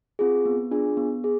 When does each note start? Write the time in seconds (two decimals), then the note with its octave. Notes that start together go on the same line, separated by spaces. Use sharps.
0.19 C4 F4 G#4
0.45 B3
0.71 D4 F4 G#4
0.97 B3
1.24 G#4